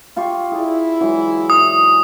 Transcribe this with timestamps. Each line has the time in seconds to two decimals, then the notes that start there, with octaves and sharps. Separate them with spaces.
0.16 F4 G4 C#6
0.51 E4 G#4 D5
1.01 E3 F#3 G#3
1.50 D#6